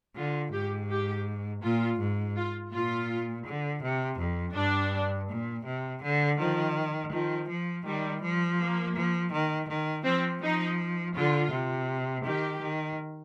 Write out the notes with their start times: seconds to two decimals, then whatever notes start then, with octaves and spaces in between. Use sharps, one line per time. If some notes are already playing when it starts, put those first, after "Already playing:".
0.16 D3 F4
0.52 G#2 G4
0.90 G4
1.63 A#2 F4
1.99 G#2
2.37 F4
2.73 A#2 F4
3.46 D3
3.83 C3
4.19 F2
4.56 G2 D4
5.30 A#2
5.66 C3
6.03 D3
6.39 D#3 F3
7.12 D#3 F3
7.49 F3
7.85 D#3 G3
8.22 F3
8.58 A#3
8.96 F3
9.33 D#3
9.69 D#3
10.05 F3 C4
10.42 F3 D#4
11.15 D3 F4
11.51 C3
12.25 D#3 G4
12.62 D#3